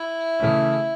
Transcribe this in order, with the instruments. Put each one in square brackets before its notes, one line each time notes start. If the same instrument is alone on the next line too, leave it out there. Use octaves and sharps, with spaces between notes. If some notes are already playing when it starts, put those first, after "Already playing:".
Already playing: [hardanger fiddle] E4
[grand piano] C#3 E3 A3 C#4